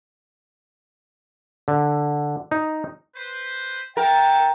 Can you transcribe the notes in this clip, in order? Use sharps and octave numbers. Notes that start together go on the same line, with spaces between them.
D3
D#4
B4 C5
D4 A4 A#4 E5 F#5 G5 A5